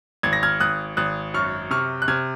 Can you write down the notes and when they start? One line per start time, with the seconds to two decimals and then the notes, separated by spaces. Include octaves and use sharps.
0.23 G#1 G#6
0.33 A#6
0.43 F6 G#6
0.60 G#1 D#6 F#6
0.97 G#1 D#6 F#6
1.34 F#2 C#6 F6
1.71 C3 C#6 F6
2.02 F#6
2.08 C3 F6 G#6